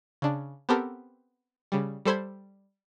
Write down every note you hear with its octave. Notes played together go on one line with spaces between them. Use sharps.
C#3 D4
B3 C4 G4 A4 A#4
C#3 G3
G3 A4 C5 B5 G#6